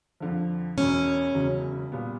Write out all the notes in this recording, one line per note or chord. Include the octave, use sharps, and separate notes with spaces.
F2 D3 F3
E1 E2 B2 C#4
E1 E2 C#3 F#3
A#2 G3 B3